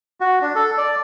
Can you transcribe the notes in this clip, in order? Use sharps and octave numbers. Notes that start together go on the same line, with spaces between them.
F#4
D4
A4
D5